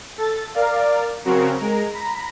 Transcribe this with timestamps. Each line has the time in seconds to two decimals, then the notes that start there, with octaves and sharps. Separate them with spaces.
0.18 A4 A6
0.54 A#4 D5 F5
1.25 C#3 F#3 C4 F#4 A#4
1.59 G#3 A#4
1.93 A#5 B5